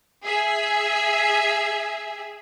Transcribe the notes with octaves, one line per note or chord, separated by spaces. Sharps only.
G#4 E5